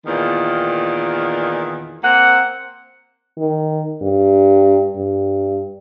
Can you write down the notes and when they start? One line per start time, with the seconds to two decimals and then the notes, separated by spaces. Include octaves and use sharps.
0.05 E2 A#2 D#3
2.02 A#3 C4 F#5
3.38 D#3
4.02 G2
4.96 G2